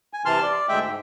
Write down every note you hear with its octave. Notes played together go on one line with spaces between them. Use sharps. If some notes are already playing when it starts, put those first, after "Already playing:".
G#5
C3 E3 A5 C6 F6
D5
D2 G#3 E5 G5
G#2